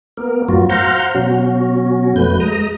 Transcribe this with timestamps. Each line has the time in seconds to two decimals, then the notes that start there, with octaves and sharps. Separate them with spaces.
0.17 A#3 B3 A#4
0.49 F#2 A2 F#3 F4 F#4
0.69 C5 F5 F#5 A#5 F6 G6
1.15 B2 F#3 C#4 F#4
2.16 F2 A3 B4 G6
2.40 G#3 A#5 D#6